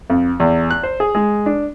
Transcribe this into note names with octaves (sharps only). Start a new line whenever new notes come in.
F2
E2
F#6
C5
G#4
G#3
D4